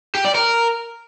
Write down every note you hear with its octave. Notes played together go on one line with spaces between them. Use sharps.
G4
D5
A#4